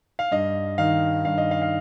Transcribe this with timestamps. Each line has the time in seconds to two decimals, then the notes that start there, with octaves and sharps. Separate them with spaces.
0.19 F5
0.31 G2 D#5
0.78 D#3 F5
1.25 G2 F5
1.38 D#5
1.51 F5
1.62 F5